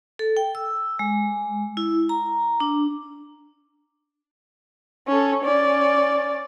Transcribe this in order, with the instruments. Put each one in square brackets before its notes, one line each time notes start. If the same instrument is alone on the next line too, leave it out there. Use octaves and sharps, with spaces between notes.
[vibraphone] A4
G5
E6
G#3
E4
A#5
D4
[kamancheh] C#4 A4
C#4 D5